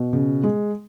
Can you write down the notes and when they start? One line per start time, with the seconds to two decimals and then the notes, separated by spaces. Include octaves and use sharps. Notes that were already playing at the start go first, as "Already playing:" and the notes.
Already playing: B2
0.13 C#3
0.44 G#3